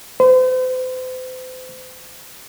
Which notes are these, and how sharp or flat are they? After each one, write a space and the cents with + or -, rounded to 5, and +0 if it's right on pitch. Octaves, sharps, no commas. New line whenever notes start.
C5 -40